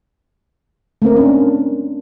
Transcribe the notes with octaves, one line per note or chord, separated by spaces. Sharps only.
A3 A#3 C4 A#4
C#4 D4